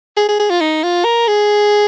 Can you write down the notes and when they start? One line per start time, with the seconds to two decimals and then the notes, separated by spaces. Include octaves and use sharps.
0.17 G#4
0.29 G#4
0.40 G#4
0.50 F4
0.61 D#4
0.83 F4
1.05 A#4
1.28 G#4